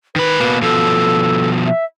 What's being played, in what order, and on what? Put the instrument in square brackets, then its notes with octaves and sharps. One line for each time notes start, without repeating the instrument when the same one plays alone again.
[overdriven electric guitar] D#3 B5 [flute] B4
[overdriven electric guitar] B2 A#3
[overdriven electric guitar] B2 F3 [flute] A4
[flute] E5